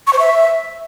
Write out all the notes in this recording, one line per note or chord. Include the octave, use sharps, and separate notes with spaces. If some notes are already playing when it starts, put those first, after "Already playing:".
C#6
C5
E5